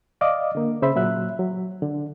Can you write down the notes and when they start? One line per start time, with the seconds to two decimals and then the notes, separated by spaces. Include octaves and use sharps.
0.21 D5 D#5 F5 D6 D#6
0.55 D3 A#3
0.82 C#3 C5 E5 B5
0.96 A#2 F#3 E5 F#6
1.39 F#3
1.82 D3